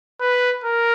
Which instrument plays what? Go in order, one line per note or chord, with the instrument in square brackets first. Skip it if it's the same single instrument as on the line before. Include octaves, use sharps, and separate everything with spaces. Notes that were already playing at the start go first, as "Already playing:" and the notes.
[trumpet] B4
A#4